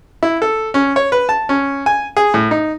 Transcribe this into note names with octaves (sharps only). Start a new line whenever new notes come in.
E4
A4
C#4
C#5
B4
A5
C#4
G#5
G#4
A2
D#4